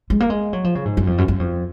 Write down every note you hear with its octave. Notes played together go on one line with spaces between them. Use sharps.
G#3
A#3
G#3
F#3
F3
C#3
G#2
F#2
F2
F#2
F#2
F2